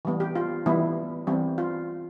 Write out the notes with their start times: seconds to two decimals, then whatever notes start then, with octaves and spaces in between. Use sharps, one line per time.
0.05 E3 G3 B3
0.20 G4
0.36 F4
0.66 E3 G3 B3 E4
1.27 E3 G3 C4
1.58 F4